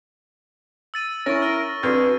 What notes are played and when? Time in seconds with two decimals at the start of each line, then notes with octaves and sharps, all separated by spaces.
0.94 E6 A6 D#7
1.26 C#4 E4 A#4 C#6 A#6
1.42 F6
1.83 F2 D4 F#4 G#4 B4 F6